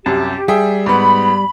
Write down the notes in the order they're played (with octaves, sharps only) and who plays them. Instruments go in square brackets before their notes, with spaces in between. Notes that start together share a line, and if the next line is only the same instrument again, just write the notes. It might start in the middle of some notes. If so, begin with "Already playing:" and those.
[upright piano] C2 F#2 [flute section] G4 [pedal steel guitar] A5
[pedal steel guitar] G3 [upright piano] G#4 E5 G5
[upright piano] G#2 B3 [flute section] B5